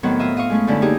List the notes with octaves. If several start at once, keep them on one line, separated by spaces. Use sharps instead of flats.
A2 D#3 F#3 B3 C4
F4 D#5 E5
D#5 F5 C#6
G#3 A3 C#4
F#2 D3 C#4 E4
A#3 D#4 G4 G#4